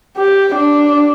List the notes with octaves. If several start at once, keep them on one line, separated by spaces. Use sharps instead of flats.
G4
D4